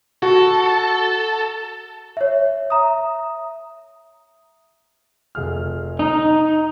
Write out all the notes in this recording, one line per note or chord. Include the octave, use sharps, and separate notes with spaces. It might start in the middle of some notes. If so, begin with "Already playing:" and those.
F#4 A4
C#5 E5
E5 A#5 D#6
F1 G#4 F6
D#4 A#5